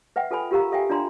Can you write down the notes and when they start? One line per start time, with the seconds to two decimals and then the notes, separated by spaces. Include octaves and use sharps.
0.16 B4 E5 F#5 G5
0.31 F4 A4 B4 G#5 B5
0.51 F4 G4 A#4 F5 A#5
0.72 A4 E5 F5 G5 G#5
0.90 D4 F4 D5 A#5 C6